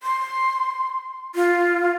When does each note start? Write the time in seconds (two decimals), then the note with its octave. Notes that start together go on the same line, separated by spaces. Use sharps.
0.03 C6
1.35 F4